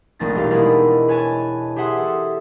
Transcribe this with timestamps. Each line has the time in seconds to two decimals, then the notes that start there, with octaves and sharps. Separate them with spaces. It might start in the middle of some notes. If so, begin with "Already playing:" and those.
0.19 A#1 A3 C4 D#4 A6 A#6
0.35 E1 D#4 G4 F5
0.51 G#3 B3 D4 E4 A#4
1.08 B4 C#5 G#5 A5
1.76 G4 G#4 E5 F#5 C6 D#6
1.99 A4